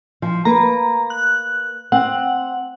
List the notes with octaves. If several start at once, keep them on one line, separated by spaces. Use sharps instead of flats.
F3
A#3 B4 A#5
F#6
C4 F#5